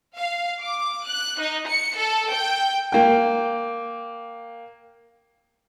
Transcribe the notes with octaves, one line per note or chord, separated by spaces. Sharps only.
F5
D6
F#6
D#4
C#7
A4
G5
A#3 G5